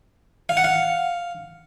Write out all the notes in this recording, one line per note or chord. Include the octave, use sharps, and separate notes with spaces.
F5
F#5
F5